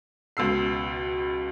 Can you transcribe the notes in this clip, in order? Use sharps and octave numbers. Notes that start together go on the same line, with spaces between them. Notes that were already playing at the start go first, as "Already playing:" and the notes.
C#2 B2 E6 C7